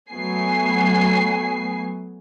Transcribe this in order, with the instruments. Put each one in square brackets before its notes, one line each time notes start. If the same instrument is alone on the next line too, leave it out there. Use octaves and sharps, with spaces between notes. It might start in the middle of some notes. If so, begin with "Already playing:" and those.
[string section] F#3 A3 B3 G#5 C7